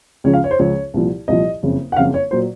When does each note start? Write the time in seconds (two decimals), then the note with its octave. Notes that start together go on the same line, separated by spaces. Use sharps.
0.24 C#2 C#3 F3 C#5
0.33 F5
0.44 C#5
0.51 C5
0.59 C#2 C#3 F3 C#5
0.94 C2 A#2 F3
1.28 C2 A#2 F3 D#5
1.63 F#1 F2 C#3
1.92 F#5
1.96 F#1 F2 C#3 F5
2.14 C#5
2.31 A#2 F#3 C5